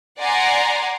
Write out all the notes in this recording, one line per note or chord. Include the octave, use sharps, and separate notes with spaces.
D5 F#5 G#5 A#5 C6